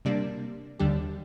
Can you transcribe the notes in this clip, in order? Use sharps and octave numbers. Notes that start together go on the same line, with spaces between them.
C3 G3 A#3 D4
D#2 D3 G3 D4 G4